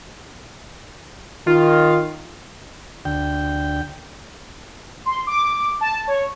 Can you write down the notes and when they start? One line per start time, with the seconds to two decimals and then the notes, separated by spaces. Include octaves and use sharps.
1.47 D#3 F4
3.05 D2 G5
5.05 C6
5.27 D6
5.81 A5
6.07 C#5